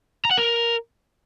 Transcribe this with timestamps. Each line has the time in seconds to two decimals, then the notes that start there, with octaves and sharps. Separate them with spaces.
0.25 A#5
0.31 F#5
0.37 A#4